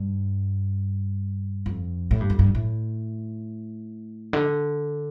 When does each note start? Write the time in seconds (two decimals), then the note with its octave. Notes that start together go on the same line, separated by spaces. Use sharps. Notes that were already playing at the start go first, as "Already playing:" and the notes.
Already playing: G2
1.66 F2
2.11 A2
2.21 G2
2.30 F2
2.39 G2
2.55 A2
4.33 D3